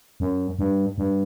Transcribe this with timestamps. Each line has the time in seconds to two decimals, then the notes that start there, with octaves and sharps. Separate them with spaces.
0.20 F#2
0.59 G2
0.98 G2